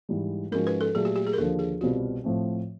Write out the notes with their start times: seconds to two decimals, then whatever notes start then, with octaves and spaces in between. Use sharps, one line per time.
0.09 G#2 E3 G3
0.51 G#2 F3 G#3 C#4 F#4 A#4
0.67 B4
0.81 A4
0.95 A#2 F#3 A3 G#4
1.05 G4
1.16 G4
1.27 G#4
1.33 A#4
1.37 D#2 D3 F3 A4
1.59 G#4
1.81 C2 B2 G3 C4 F4 F#4
2.24 A2 F3 A3 C4